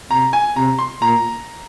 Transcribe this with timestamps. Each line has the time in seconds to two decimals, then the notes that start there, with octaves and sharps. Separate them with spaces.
0.11 C3 A#5
0.33 G#5
0.56 C3 A#5
0.79 C6
1.02 A#2 A#5